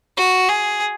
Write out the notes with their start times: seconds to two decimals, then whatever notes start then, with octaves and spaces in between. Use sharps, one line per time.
0.17 F#4
0.49 G#4